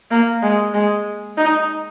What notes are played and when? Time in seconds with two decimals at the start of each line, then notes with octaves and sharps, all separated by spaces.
0.11 A#3
0.42 G#3
0.74 G#3
1.38 D#4